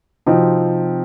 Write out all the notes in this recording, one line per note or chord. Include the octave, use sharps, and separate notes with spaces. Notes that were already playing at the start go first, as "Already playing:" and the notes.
C3 F3 C4 D#4 F#4